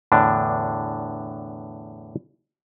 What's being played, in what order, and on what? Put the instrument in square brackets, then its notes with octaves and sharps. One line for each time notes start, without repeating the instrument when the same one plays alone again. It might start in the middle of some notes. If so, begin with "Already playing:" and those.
[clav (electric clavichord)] E2 A2 D3 D4